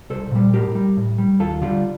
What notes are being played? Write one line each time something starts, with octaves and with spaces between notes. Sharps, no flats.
C2 A4 C5
A#2 G3
A2 G4 A#4
G3
A2
G3
D#2 F4 A4
D3 G3 D4 F4